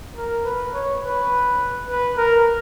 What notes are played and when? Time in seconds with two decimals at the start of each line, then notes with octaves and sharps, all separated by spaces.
0.16 A#4
0.45 B4
0.74 C#5
1.02 B4
1.89 B4
2.17 A#4